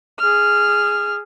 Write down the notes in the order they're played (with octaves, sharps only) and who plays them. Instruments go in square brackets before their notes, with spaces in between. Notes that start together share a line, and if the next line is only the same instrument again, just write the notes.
[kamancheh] G#4 F6